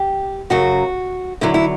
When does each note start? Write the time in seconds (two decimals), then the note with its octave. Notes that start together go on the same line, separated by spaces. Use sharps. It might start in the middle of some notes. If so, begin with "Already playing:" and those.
Already playing: G4
0.50 F#2 C#3 F#3 F#4
1.41 E2 D3 F#3 E4
1.54 E4